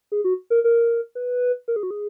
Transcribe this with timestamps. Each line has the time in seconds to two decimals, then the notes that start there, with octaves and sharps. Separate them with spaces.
0.12 G#4
0.24 F#4
0.50 A#4
0.64 A#4
1.15 B4
1.68 A#4
1.76 G#4
1.83 F#4
1.91 G#4